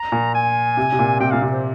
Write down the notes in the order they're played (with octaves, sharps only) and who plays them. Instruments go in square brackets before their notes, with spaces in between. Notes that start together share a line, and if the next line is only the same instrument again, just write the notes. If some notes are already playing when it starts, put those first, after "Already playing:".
Already playing: [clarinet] A#5
[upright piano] A#2
[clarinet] G#5
[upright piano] C3
C3
A#2
[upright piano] C3 [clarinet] G5
[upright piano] A#2 [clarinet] F5
[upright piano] C3
[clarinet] C5